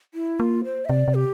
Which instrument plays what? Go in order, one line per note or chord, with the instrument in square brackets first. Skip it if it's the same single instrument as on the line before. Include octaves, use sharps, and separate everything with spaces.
[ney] E4
[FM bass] A#3 [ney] F4
[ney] C5
E5
[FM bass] C3 [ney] D5
[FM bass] C3
[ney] G4